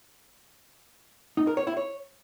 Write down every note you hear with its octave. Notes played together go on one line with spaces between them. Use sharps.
D#4
A#4
C#5
E4
C#5